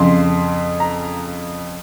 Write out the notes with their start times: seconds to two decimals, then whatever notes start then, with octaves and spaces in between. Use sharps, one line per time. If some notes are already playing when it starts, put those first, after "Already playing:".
Already playing: F2 C#3 C6
0.80 A#5